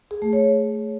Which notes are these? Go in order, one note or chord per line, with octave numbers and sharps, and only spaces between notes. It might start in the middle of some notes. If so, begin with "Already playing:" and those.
G#4
A3
C#5